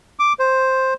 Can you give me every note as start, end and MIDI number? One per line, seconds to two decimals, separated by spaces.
0.19 0.33 86
0.39 0.94 72